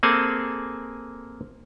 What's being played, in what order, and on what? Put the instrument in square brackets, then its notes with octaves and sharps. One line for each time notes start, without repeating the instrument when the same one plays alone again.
[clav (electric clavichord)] A#3 C4 G#4 A4 G#5 A5